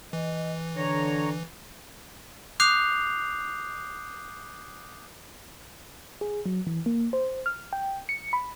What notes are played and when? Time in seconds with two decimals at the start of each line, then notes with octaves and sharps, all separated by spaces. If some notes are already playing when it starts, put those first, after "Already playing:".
0.13 E3 D#5
0.76 D3 C#5 A#5
2.60 D6 D#6 F#6 G6 C7 F7
6.21 G#4
6.46 F#3
6.67 E3
6.86 A#3
7.13 C5
7.46 F6
7.73 G5
8.09 C#7
8.33 B5